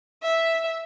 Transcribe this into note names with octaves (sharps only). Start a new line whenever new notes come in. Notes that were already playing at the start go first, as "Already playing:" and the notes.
E5